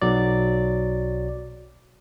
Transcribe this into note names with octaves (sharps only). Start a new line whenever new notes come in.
B1 F#3 D5